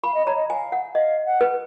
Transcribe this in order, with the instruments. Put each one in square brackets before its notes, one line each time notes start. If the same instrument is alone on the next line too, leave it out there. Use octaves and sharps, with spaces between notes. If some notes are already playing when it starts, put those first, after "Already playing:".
[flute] F5 [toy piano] B5
[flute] D#5
[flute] C#5 [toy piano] A#5
[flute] D#5
[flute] F5 [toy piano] G#5
[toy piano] F#5
[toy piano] D#5 [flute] F5
[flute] F#5
[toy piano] B4